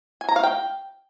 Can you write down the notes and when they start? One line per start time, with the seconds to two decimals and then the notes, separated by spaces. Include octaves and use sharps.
0.21 G#5
0.29 A#5
0.36 F5
0.44 G5